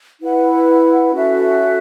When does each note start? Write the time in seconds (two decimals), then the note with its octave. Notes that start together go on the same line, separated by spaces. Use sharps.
0.19 E4 B4 F#5
1.12 C#4 F#4 A4 E5